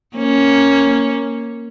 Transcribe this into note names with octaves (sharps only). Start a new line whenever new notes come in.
A#3 C#4